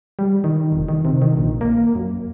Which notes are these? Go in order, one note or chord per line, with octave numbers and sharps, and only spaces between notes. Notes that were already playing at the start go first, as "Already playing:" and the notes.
G3
D#3
F1
D#3
C3
D#3
A#1
A#3
F#2